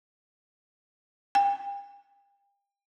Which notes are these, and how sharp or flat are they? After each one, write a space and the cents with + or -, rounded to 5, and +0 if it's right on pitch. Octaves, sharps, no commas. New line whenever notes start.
G5 +40